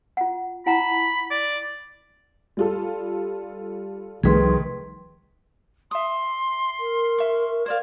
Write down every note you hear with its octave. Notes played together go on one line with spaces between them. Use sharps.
F4 F#5
E4 F#5 A#5 B5
D5
G3 F4 A4
C2 D#3 F3 G3 A3 G#4 B4 C6
E5 C6 D#6
A#4
E5 C#6
C5 D5 F5 G#6